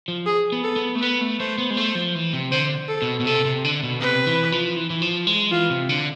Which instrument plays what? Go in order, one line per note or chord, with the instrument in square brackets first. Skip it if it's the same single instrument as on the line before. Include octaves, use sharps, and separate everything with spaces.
[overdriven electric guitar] F3
[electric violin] G#4
[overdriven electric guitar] B3
[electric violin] A4
[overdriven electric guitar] B3
A3
[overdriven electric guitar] B3 [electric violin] B4
[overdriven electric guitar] A3
[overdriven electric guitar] A3 [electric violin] C5
[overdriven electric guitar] B3
G#3
[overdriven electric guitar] A3 [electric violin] C5
[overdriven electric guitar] F3
E3
C3
[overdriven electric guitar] D3 [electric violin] C5
[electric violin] A4
[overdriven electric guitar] B2
B2
[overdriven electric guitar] C3 [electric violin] A4
[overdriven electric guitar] C3
D3
B2
[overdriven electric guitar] C3 [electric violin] B4
[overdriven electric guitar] E3
F3
E3
E3
F3
G#3
[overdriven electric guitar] E3 [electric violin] F4
[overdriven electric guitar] C3
D3